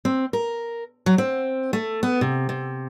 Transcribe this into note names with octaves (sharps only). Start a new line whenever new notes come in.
C4
A#4
F#3
C4
A3
B3
C3
C3